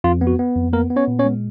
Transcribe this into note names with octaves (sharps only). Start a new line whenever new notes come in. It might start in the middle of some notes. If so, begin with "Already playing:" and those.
F2 F4
B3
F#4
B3
F2
A#3 B3 A#4
B3
C#4 C#5
A#2
C#4 C#5
G#3